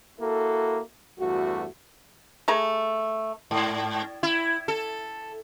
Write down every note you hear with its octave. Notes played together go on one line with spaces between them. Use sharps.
A#3 E4 F#4 A4
E2 G2 A3 F#4
A3 G#4 A#5
G#2
E4
A4